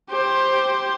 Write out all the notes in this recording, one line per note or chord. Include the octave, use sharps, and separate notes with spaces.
G4 C5